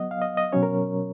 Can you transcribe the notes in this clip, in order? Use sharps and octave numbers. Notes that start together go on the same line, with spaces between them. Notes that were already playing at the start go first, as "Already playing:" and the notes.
Already playing: F#3 B3 D#5 F#5
F5
D#5
D#5
B2 F#3 C#4 C#5
A#4